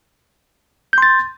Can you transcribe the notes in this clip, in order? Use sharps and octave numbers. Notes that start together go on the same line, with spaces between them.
C6 G6 A6